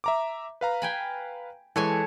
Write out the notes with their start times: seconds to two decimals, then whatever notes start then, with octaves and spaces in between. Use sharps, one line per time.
0.04 E5 A#5 D6
0.61 B4 F5 A#5
0.82 G5 G#5 B5
1.76 E3 G#3 A4 C#5 G#5